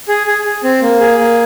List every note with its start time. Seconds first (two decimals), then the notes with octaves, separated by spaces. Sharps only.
0.09 G#4
0.27 G#4
0.45 G#4
0.64 C4
0.82 A#3
1.00 G#4
1.19 A#3